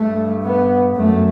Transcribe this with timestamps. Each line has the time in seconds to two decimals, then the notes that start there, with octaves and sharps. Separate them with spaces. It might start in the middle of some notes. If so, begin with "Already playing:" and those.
Already playing: G2 A3
0.44 B3
0.95 F#2 A3